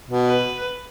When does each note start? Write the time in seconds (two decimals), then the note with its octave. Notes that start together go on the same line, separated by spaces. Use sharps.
0.09 B2
0.27 B4